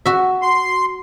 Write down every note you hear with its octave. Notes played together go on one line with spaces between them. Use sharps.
F#4 E5
C6